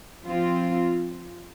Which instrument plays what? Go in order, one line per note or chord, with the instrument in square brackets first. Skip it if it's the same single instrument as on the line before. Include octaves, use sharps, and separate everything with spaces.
[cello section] F3 C4 F4